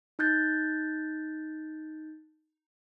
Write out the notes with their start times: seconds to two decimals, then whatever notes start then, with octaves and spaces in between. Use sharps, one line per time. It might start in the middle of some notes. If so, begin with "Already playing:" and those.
0.19 D#4 F#6 G6 A6